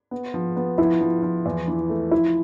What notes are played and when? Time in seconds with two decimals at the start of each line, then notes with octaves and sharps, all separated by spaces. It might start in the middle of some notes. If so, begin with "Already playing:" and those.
0.11 B3
0.34 F3
0.56 B3
0.78 F3 E4
1.01 F3
1.23 F3
1.46 E2
1.68 E3
1.90 A3
2.11 F3 E4